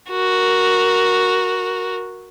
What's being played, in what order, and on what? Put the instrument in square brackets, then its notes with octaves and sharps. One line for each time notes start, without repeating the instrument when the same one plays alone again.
[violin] F#4 A#4